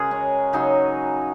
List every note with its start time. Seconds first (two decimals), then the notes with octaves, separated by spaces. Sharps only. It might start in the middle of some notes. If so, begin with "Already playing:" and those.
Already playing: C#3 G#3 F#4 G#4 A#4
0.11 C#4
0.53 C#3 F#3 D#4